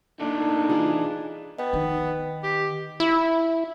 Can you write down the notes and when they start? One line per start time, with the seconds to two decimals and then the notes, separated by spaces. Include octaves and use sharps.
0.20 A#2 A3 D4 D#4
0.69 E3 F4 G#4
1.59 B3 D#5 G5
1.73 D#3
2.44 G4
3.00 E4